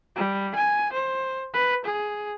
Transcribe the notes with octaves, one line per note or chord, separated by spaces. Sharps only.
G3
G#5
C5
B4
G#4